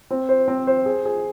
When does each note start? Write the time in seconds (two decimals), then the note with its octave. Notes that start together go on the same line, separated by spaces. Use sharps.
0.11 C4
0.29 C5
0.48 C4
0.67 C5
0.86 G#4
1.05 G#4